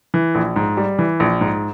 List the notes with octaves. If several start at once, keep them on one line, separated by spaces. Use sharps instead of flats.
E3
A#1
G#2
G3
E3
A#1
G#2